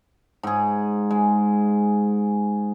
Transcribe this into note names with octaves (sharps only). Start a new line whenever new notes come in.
G#2 G#4
G#3